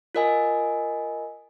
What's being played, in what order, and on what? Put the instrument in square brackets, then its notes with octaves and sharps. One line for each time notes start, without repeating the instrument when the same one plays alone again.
[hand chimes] F4 A#4 D#5 G#5